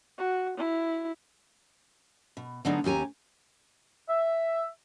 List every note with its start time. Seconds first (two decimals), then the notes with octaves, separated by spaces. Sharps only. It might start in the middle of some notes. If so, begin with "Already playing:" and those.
0.18 F#4
0.58 E4
2.37 B2
2.65 D3 F#3 G#3 B3 D4 D#4
2.84 D#2 C#4 G4 G#5 A#5
4.08 E5